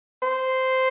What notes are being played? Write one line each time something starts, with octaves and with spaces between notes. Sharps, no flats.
C5